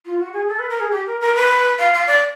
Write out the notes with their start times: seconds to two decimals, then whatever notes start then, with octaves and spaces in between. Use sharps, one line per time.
0.05 F4
0.18 F#4
0.32 G#4
0.48 A4
0.59 B4
0.69 A#4
0.80 G#4
0.91 G4
1.06 A#4
1.20 A#4
1.35 B4
1.78 F5
1.92 F5
2.06 D5